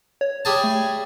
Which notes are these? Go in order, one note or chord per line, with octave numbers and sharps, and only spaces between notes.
C#5
G3 G#4 A5
A3